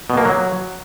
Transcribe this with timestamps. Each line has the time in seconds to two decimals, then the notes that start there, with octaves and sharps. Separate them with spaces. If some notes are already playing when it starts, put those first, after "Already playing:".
0.10 B2
0.17 A#3
0.25 F#3